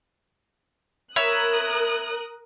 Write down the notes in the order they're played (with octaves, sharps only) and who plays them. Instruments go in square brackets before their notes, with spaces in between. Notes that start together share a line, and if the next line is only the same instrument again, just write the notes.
[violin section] A#4 D#6 F#6 [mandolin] C#5 E5 B5